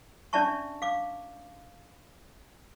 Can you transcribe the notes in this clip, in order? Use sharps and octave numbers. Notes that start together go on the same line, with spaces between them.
C#4 D4 D5 E5 A5 C#6
F5 D6